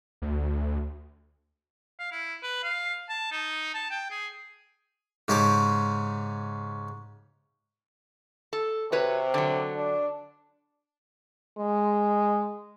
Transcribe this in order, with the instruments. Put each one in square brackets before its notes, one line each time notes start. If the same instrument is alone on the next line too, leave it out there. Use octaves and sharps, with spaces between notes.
[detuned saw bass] D2
[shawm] F5
E4
B4
F5
A5
D#4
A5
G5
G#4
[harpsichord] G#2 C#3 C#4 G4 A5 D6
[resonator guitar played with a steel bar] A4
[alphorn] C3 [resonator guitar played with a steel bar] F#4 B4 C#5
[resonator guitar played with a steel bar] D3 F#3
[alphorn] D4
G#3